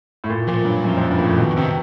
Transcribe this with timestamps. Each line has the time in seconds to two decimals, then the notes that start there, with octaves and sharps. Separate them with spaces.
0.24 A2
0.30 A#2
0.47 A#2 F3
0.65 G2 F#3
0.84 F#2 F3
0.97 F2
1.11 G2 F3
1.19 A#2
1.24 A2
1.38 B2 D#3
1.56 C3 D#3